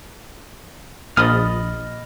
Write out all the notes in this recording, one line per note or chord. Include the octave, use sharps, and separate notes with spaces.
A#1 D#5 B5 D#6 F6 A6